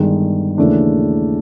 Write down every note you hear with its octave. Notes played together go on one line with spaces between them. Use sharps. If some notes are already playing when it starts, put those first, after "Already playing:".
Already playing: G1 G2 D#3 G#3
D#2 C#3 E3 A3 D4